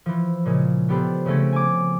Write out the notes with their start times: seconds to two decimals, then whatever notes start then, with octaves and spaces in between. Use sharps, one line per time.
0.06 E3 F3
0.45 A#2 C#3 G#3
0.89 B3 D4 G4 A4 B4 C5
1.26 C#3 F3 A3 C4 C#4
1.52 G#5 D6